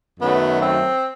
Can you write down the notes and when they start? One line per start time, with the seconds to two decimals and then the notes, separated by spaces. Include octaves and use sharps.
0.20 F#2 D#3 F#3 A3 B3
0.62 C4